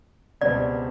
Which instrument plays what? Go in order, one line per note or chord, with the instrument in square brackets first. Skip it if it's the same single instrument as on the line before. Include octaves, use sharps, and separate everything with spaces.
[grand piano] C#2 B2 G3 C4 [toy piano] D5